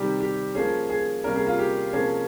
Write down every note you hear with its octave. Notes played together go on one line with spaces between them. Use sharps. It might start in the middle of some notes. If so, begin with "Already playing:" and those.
Already playing: C3 D#3 G3 G4
G4
F3 A#3 C#4 G#4
G#4
C3 G3 A#3 C#4 A#4
G#4
F4
G4
C3 F3 A#3 C#4 G#4